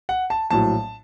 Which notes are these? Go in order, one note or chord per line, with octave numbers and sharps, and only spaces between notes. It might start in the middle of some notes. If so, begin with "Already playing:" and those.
F#5
A5
A#1 A2 F#3 A5